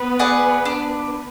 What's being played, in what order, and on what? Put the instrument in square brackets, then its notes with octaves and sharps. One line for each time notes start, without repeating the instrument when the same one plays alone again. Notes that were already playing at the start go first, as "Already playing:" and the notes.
Already playing: [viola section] B3 B4
[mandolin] G#4 D5 F#5
D4